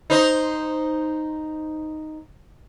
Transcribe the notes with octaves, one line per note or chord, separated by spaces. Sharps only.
D#4 C5 D#5